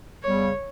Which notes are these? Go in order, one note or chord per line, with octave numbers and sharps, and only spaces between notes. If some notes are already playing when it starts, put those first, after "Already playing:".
E2 C#3 G3 C#5